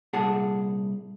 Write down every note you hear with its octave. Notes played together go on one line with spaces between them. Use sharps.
C2 A#2 G#4 F#5 A5